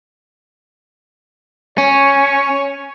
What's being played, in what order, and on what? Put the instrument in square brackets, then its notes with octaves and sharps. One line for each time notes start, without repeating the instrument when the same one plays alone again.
[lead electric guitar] C#4 [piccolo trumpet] C#5